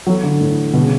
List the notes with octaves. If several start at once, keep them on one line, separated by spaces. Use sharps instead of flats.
E3 F#3 B3 E4 A4
D3
A2
B2 D3 G3 B3 F#4
C#3